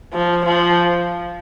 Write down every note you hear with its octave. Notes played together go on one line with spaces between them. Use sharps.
F3
F3